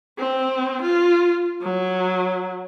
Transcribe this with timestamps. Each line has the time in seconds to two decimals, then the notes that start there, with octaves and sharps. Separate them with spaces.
0.18 C4
0.82 F4
1.62 F#3